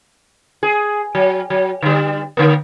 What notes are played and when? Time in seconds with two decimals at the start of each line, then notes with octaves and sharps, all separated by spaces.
0.63 G#4
1.15 F#3
1.50 F#3
1.83 D3 G3
2.37 D3 A#3